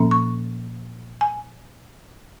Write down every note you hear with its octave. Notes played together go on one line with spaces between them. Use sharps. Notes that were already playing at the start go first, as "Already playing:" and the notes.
Already playing: A#2 F3 A#3 C#4
C#6
G#5